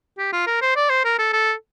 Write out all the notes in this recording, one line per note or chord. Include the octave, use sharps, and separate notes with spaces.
G4
F4
A#4
C5
D5
C5
A#4
A4
A4